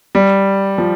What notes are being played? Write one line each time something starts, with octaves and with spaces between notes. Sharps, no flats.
G3
F3